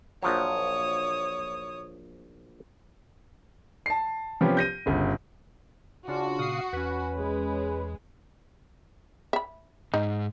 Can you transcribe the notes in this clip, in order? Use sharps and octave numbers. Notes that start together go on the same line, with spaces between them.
A#1 F3 F#3 C#5 D#6
A5 C7
C3 F3 B3 C#4 G4
G6 A#6 D#7
G1 C#3
C#3 D4 F4 F#4 D5
A#2 C#3 F5 D#6 C7
E2 C#4 B4
G#3
E5 B5
G#2 D#4